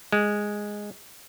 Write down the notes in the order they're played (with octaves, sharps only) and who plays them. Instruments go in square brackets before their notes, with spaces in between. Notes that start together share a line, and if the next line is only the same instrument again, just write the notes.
[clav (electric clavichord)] G#3